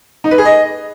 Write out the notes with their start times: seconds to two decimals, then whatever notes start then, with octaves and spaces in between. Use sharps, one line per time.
0.24 D#4
0.31 B4
0.38 G#4
0.45 D#5